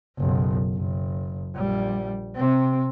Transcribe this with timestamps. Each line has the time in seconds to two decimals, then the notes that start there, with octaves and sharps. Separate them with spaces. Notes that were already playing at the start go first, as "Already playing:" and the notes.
0.19 F#1 B1
0.75 F#1
1.55 A#1 G3
2.36 C3 C4